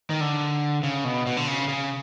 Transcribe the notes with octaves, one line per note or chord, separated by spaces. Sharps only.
D#3
D3
C#3
B2
B2
D3
C#3
C#3